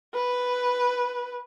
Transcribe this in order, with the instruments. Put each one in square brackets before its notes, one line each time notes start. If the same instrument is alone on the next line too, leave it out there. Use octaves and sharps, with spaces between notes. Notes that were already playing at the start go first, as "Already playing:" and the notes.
[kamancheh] B4